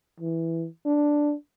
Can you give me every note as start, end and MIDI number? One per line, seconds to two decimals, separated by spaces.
0.20 0.67 52
0.86 1.34 62